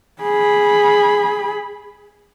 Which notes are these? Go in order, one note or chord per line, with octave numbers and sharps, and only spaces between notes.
G#4 B5